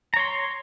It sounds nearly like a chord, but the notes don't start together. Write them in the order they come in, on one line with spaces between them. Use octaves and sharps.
A#5 C#5 C6